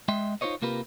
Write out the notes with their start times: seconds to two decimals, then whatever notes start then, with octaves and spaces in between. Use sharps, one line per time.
0.08 G#3 D#5 E5 G5 C6
0.41 D#4 F4 A#4 C5 C#5 D#5
0.62 C3 A#3 F4 G4 A#4 B4